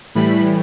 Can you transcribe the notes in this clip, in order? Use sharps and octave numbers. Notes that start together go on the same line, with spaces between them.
A2 E3 G3 B5